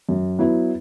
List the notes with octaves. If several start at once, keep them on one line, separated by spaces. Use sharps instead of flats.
F#2
F#3 B3 E4